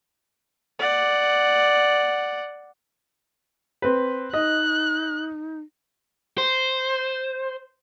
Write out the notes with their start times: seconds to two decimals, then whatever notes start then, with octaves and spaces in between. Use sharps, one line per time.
0.79 D5 F#5
3.82 C4 B4
4.34 D#4 D#5 F#6
6.38 C5